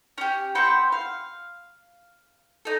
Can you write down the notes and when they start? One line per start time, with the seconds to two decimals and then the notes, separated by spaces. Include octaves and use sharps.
0.18 C#4 G4
0.55 C4 F#5 G5 B5
0.92 F5
2.65 D#4 A4